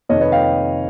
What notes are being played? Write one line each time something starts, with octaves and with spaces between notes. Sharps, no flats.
F2 C3 D#3 C#5 D#5
B4 C#5
F5 G5